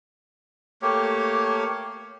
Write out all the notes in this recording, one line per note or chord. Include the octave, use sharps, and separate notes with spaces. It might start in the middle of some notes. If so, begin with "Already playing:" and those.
A3 A#3 G4 C#5